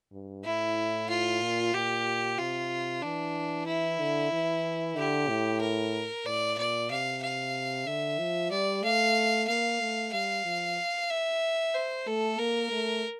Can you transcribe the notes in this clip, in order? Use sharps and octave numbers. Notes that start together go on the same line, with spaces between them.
G2
A2 E4
F4
A#2
A#2 G4
C3 F4
E3 D4
E4
D3
E3
D3 G4
A2
A#4
A2 D5
A#2 D5
C3 F5
F5
D3 E5
F3
G3 D5
A3 F5
A#3 F5
A3
G3 F5
F3
E5
C5
A3 A4
A#3 A#4
A3